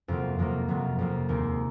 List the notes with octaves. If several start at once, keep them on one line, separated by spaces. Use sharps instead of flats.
F2 C3 F#3 A#3
F2 C3 F#3 A#3
F2 C3 F#3 A#3
F2 C3 F#3 A#3
D#2 D#3 G#3 C4 D#4